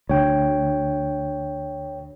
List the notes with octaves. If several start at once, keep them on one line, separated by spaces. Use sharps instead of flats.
D2 C#5 G5